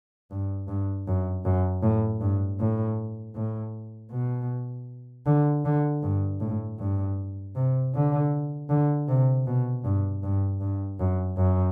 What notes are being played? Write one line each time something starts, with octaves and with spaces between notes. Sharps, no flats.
G2
G2
F#2
F#2
A2
G2
A2
A2
B2
D3
D3
G2
A2
G2
C3
D3
D3
C3
B2
G2
G2
G2
F#2
F#2